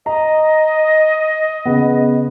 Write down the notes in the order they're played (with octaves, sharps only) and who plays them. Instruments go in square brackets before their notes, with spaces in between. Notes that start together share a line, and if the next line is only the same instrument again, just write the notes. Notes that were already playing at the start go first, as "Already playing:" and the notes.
[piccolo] D#5 [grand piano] A#5
[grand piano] C#3 B3